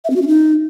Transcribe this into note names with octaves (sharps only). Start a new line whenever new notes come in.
E5
C4
F#4
C#4
D#4